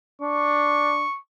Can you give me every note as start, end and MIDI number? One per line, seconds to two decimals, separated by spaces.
0.22 1.04 62
0.22 1.19 85